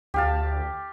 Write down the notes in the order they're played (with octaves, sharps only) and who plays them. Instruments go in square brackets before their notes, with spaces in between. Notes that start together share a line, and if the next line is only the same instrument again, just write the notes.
[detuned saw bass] D2 [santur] G4 F5 A5